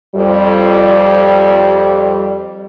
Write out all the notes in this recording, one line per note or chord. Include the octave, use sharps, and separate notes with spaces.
F2 G3